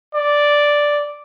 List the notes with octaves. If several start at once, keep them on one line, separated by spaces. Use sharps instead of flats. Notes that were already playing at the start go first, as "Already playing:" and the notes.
D5